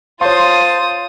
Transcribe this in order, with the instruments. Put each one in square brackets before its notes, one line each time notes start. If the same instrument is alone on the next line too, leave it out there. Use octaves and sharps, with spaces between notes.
[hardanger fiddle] F4 D#6 [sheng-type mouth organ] C5 A5 [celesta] C#5 F5 [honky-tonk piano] C6